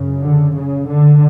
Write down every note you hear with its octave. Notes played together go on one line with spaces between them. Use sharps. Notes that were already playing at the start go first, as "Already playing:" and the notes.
Already playing: F#2 C#3
D3
C#3
D3